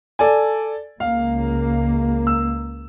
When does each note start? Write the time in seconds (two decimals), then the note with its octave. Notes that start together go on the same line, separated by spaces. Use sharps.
0.19 A4 D5 G#5
1.00 C#2 A#3 F5
2.27 E6